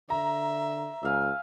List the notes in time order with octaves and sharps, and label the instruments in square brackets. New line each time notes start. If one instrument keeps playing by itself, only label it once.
[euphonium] D3 [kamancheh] E5 [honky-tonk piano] A#5
[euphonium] C#2 [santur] E5 F5 G#5